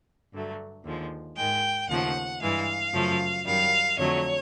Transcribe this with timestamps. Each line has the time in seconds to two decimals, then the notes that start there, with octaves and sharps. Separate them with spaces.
0.33 G2 D3 F#3 A3
0.84 D#2 D3 F3 G#3
1.36 G#2 D#3 G#3 G5
1.89 D#2 C#3 F3 A3 F#5
2.41 G2 E3 G#3 F5
2.93 F#2 C#3 F3 A3
3.46 F#2 D#3 G3 F5
3.98 F2 D3 F#3 A3 C#5